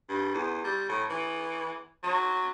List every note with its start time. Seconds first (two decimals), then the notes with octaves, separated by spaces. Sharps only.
0.09 G2
0.34 E2
0.64 G3
0.89 A2
1.10 E3
2.03 F#3